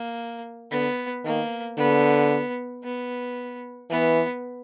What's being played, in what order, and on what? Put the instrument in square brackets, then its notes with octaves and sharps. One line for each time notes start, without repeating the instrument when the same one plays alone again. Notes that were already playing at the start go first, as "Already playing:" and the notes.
Already playing: [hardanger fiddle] A#3
[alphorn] D3 [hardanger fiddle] B3
[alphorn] D#3 [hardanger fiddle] A#3
[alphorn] D3 [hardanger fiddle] B3
[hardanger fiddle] B3
[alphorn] E3 [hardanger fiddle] B3